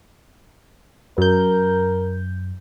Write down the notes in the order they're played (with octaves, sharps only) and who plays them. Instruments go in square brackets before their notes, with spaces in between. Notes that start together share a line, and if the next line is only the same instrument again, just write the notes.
[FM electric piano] F#2 G6 [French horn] A#4